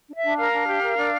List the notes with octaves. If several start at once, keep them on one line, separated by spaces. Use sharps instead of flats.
D4
E5
D4
A#4 F5
D4
G4
A#4
D4